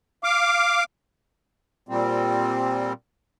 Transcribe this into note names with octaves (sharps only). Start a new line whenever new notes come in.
F5 D6
A#2 G3 C4